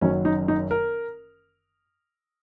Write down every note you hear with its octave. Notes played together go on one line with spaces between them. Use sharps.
F#1 F#2 D#3 F#3 C#4
D#4
D#4
A#4